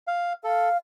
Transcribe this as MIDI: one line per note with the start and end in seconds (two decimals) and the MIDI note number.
0.07 0.33 77
0.44 0.69 69
0.44 0.77 77